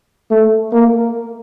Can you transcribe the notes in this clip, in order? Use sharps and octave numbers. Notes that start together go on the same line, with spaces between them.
A3
A#3